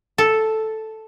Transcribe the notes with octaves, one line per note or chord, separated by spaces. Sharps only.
A4